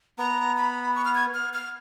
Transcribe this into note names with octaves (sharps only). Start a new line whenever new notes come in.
B3 A#5
B5
C#6
F6
G#6
F6
F6